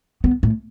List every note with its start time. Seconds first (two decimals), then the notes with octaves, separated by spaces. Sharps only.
0.24 B3
0.43 A2